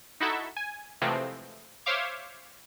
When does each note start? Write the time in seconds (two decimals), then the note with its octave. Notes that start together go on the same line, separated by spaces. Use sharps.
0.20 D#4 E4 F#4 A4 E5
0.57 G#5
1.02 C3 E3 F3 G#3 A3 C4
1.86 C5 C#5 E5 F5 D6 G#6